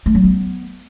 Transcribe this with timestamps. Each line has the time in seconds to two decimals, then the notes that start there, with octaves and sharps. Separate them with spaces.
0.06 A3
0.15 F#3
0.24 B3